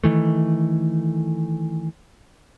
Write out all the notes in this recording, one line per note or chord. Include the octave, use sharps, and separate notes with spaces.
D#3 E3 A3